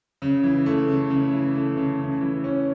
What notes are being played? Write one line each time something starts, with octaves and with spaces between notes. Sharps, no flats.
C#3
E3
A3
C#3
C#3
E3
A3
C#3
C#3
E3
C#4